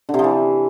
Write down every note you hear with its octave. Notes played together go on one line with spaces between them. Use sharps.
D3
C3
F3
E3